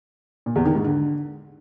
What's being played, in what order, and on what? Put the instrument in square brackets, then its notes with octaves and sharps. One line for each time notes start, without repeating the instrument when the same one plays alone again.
[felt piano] A#2
E2
D#3
G#2
D3